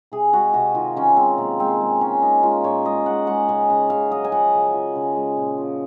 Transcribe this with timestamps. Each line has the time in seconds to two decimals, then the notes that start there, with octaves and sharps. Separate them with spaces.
0.12 C3 G#4
0.33 G#3 F#4
0.54 C3 F#4
0.75 D#3 F4
0.96 D#3 C#4
1.17 G#3 C4
1.38 C3 A#3
1.59 G#3 C4
1.81 G#3
2.01 G#3 C#4
2.22 G#3 D#4
2.43 G#3 F4
2.64 A#2 C#5
2.85 G#3 D#5
3.06 G#3 F#5
3.27 G#3 F#5
3.48 C#3 G#5
3.69 C#3 F#5
3.90 C#3 F5
4.11 F#3 D#5
4.24 G#5
4.32 F3 F#5
4.54 C#3
4.74 F3
4.96 C#3
5.16 G#3
5.37 A#2
5.58 F3